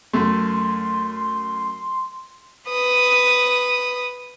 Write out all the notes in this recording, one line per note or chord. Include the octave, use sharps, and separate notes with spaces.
F#2 A3 C6
B4 D#6